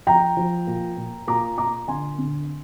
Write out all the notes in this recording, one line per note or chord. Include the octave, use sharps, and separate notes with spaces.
F3 G5 A#5
F3
A#2
A#2
A#2 A#5 D6
A#2 A#5 D6
D3 G#5 C6
D3